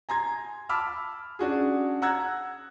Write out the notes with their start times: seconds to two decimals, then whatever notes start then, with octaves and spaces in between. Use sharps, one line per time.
0.09 G#5 A#5 C6 G#6
0.69 A5 B5 D6 E6 F6
1.39 C#4 D4 F#4 G#4
2.02 F#5 A#5 E6 F#6 G#6